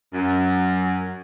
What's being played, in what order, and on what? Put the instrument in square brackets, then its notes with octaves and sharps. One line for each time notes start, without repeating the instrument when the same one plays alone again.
[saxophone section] F#2